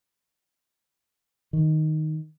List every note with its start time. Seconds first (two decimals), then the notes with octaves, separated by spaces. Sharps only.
1.53 D#3